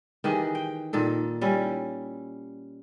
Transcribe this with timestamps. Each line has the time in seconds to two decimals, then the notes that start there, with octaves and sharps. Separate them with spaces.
0.24 D#3 E3 G4 G#4
0.55 G5
0.93 A#2 D#3 A4
1.41 G3 C#4 E4